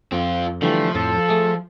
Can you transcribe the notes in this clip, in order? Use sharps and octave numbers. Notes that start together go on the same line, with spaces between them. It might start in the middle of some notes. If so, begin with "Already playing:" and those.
F2 C4 F4
D3 E3 F3 G3 A3
F2 A2 A4 A5
A3 G#4